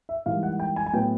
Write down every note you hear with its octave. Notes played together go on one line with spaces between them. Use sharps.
E5
G#2 E3 G3 A#3 F5
F#5
G5
G#5
G#5
A2 F#3 B3 G5